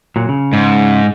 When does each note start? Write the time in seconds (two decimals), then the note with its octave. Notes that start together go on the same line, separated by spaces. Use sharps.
0.16 A#2 F#3
0.29 C#3
0.53 G#2